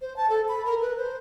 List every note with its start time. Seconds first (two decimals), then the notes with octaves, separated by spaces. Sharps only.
0.01 C5
0.16 A5
0.30 A4
0.48 B5
0.65 A#4
0.81 B4
0.97 C5